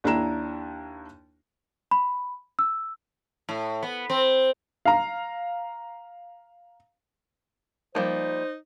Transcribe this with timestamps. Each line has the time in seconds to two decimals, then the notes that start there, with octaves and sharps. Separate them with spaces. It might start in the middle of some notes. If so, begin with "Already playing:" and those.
0.04 D#2 D4 E4 A#5 E7
1.91 B5
2.59 E6
3.49 A2
3.83 B3
4.10 C4
4.86 F5 A#5
7.95 F3 G3 A#3 D#4 C5